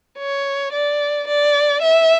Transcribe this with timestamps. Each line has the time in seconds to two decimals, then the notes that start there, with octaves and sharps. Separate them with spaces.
0.18 C#5
0.73 D5
1.28 D5
1.82 E5